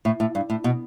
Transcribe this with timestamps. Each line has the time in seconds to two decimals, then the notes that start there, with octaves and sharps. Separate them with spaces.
0.05 A2
0.20 A2
0.35 G2
0.50 A2
0.64 B2